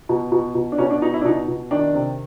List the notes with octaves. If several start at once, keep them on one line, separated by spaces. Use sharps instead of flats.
B2
B2
B2
D4
B2 C#4
D4
B2 D#4
E4
D4
B2 D#4
B2
D#3 D4
C3